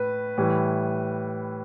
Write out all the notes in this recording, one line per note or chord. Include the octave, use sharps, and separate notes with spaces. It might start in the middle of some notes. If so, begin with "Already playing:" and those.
Already playing: A2 B4
A2 E3 G3